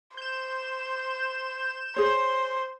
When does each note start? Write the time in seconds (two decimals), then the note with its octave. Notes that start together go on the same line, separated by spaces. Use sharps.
0.17 C5 G6 E7
1.96 G#4 C5 C#5